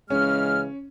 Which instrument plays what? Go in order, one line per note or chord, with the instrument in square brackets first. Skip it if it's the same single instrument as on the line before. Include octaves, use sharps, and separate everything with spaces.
[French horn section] C#3 E3 G#3 [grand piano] C#4 [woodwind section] F6